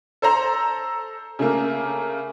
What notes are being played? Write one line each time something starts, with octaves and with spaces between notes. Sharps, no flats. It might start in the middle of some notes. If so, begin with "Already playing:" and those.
A4 C5 A#5
C#3 A3 A#3